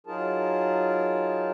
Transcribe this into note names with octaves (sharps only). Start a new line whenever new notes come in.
F#3 D#4 F4 G#4 A#4 A5